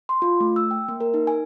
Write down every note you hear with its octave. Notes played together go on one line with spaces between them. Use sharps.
C6
F4
A3
E6
G5
A#3
A#4
D#4
G#5